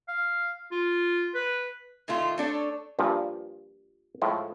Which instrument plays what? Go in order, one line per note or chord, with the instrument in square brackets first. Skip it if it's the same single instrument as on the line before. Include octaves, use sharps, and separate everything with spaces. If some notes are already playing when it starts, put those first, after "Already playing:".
[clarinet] F5
F4
B4
[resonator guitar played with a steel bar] A2 D#3 A3 F4
A3 D4 A4 C#5
[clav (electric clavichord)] G2 A#2 F3
A2 F3 G#3